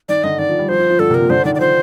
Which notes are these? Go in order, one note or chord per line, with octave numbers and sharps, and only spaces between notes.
D#3 D5
D3 D#5
D#3 D5
F3
G3
F3 C5
F3
F3
D3 A4
C3
A#4
A#2
D3 C5
D#3 D5
D5
F3 C5